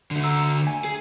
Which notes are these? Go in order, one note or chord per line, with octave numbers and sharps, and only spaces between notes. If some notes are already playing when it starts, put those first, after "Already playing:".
D3 A3
A#5 E6
G#5
G#4